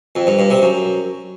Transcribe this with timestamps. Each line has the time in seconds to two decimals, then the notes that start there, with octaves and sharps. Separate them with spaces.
0.16 F2
0.27 G2
0.39 G2
0.50 C3
0.62 F#2